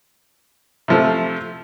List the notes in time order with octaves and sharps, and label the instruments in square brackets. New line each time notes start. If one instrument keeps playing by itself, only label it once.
[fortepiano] C3 F3 A3